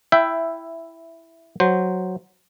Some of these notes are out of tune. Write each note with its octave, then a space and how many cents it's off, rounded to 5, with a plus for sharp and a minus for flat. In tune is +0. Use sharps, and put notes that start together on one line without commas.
E4 +0 E5 +10 G5 +0
F#3 +0 C5 +0